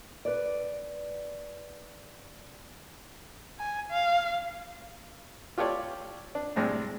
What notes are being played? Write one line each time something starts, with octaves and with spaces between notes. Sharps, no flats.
B4 D5
G#5
F5
F4 G4 A4 C#5 D5
D4
A2 C3 G3 G#3 D4